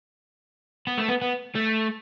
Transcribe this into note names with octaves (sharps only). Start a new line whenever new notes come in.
B3
A3
B3
B3
A3